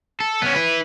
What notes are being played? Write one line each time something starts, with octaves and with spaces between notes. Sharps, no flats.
A4
B3 C#4
E4 B4